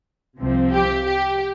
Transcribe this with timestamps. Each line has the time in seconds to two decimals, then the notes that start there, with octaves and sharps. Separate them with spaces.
0.39 C2 C3 F3 C4
0.72 G4
1.06 G4